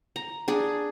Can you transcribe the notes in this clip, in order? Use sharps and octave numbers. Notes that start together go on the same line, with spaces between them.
A#5
D4 G#4